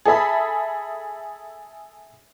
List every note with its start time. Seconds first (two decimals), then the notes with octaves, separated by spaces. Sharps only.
0.05 G#4 A4 E5 B5